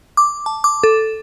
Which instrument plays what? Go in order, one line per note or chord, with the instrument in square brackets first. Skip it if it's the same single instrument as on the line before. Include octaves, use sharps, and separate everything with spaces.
[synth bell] D6
A5
D6
A4